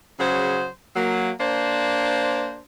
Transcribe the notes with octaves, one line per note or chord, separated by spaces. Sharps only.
C#3 F#3 G#4 C5
F#3 A#3
A#3 D4 C5